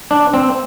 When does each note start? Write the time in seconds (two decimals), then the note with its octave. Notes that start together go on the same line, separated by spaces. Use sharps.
0.11 D4
0.34 C4